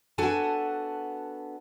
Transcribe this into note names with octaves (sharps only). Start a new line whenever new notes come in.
B3 D4 F#4 A4 G#5 A5